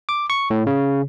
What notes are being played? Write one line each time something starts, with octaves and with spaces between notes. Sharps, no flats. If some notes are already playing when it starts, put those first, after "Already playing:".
D6
C#6
A2
C#3